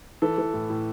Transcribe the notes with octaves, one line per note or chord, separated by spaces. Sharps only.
E3 A4
E3
A2
A2